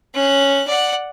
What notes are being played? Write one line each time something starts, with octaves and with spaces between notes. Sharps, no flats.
C#4 F#6
D5 F#5